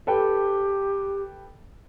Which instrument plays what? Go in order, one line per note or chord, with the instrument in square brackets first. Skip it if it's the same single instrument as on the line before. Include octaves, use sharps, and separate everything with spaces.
[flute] G4 [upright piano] A4 B4 G5